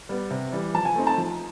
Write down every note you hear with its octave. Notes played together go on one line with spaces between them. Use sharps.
G3 B3
C3
E3 G3
F3 A5
G#5
A3 C4 D#4
A5
F3